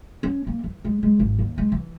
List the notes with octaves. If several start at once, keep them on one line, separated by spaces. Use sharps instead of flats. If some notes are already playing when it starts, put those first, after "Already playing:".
C#4
A#3
E3
G#3
G#3
G#1
D#2
G#3
E3